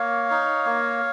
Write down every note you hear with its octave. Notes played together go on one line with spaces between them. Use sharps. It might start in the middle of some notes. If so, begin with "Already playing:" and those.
Already playing: A#3 C#5 F5
D#4
A#3